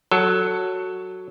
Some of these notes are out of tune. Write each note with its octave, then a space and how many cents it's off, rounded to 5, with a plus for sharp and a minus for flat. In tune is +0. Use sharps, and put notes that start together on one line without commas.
F#3 +0 A4 +15